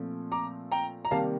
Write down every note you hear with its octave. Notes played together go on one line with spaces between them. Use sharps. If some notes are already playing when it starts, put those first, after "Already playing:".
Already playing: A#2 F3 A3 C4
A#5 D6
G5 A#5
A#5
C3 D#3 G3 A#3 F5 A5